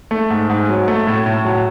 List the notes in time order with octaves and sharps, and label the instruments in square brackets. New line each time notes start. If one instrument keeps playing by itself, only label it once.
[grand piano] A3
G#2
G#2
F#3
A3
A2
A2
F#3